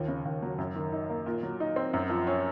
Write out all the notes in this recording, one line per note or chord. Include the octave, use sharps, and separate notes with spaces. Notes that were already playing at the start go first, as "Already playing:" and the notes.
Already playing: D#2 F3
C#3
D#2
F#3
F#2
D#3
D#4
A#3
A#2
F#3
D#4
C4
F#2
F3
C#4